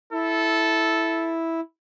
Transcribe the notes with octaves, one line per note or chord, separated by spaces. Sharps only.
E4 A4